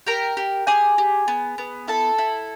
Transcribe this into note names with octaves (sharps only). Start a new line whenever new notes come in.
G4 A#4 A#5
G4
G4 G#4 G#5
G4
B3
B3
E4 A4 A5
E4